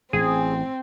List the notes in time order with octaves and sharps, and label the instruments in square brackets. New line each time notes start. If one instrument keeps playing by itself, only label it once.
[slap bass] A1 [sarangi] C4 [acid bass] G#4